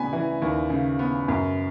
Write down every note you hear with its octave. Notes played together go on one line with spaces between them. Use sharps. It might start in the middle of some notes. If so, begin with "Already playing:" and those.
Already playing: C#3 B3 G#5 B5
E3
D#2
C#3
B3
F#2